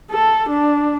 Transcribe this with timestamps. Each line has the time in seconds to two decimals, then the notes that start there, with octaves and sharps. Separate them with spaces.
0.11 A4
0.49 D4